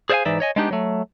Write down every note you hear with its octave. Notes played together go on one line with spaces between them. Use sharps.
G#4 C5 D5 E5 F5 G#5
G#2 E3 D#4 D5 E5
C#5 D#5 G#5
G#3 B3 D4 D#4 G4
F#3 A3